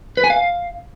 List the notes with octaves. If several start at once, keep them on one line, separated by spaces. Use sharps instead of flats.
B4
G#5
F5